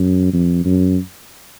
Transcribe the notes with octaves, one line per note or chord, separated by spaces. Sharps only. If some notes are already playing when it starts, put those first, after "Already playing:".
Already playing: F#2
F2
F#2